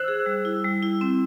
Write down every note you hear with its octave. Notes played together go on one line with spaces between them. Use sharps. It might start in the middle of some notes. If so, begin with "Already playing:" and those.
Already playing: C5 E6 F#6
G#4
G3
E4
G3
E4
C4